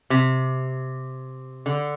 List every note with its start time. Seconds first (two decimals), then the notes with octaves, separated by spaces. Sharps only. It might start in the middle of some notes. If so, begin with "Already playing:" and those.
0.10 C3
1.66 D3